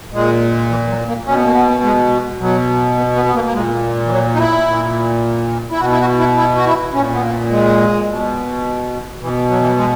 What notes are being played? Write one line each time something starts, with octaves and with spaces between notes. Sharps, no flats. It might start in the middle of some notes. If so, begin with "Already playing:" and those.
A#2 G#3
E3
F#3
A#3
B2 C#4
B3
A#3
B3
G#3
B2 F#3
B3
B3
B3
A#3
A#3
A#2 G#3
E3
F#3
D#4
E4
A#2
E4
B2 F#4
E4
F#4
E4
E4
F#4
E4
A#2 C#4
B3
A#3
G#3
B2
B2 E3
F#3
E3
F#3
G#3